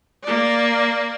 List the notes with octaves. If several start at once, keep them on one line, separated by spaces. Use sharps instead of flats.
A#3 D5